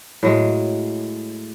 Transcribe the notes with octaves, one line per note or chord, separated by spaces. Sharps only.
A2 F#3 G#3